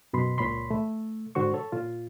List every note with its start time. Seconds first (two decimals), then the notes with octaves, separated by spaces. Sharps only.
0.13 F#2 B2 B5 C6
0.38 C#2 A#2 C#5 B5 C6
0.71 A3
1.35 G#2 D3 F#4 C5 C#6
1.54 A4 C#5
1.72 A#2 F4